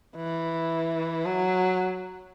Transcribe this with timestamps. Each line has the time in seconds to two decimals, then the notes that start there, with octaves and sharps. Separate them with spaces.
0.16 E3
1.25 F#3